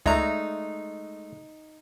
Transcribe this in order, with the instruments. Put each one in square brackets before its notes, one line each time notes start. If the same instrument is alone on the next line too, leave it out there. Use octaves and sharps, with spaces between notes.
[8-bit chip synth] C#2 A#5 [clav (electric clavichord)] G#3 A3 [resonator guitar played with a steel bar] D#4 [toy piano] D5 E5